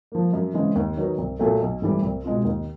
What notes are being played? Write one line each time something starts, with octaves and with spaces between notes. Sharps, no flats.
F3 A#3
F#2
C#3 E3 G#3 C4
D#2
D#3 F#3 B3 D#4
C2
A#2 F#3 A3
B1
A2 E3 G3
C2
B2 G#3 C4 F4
D#2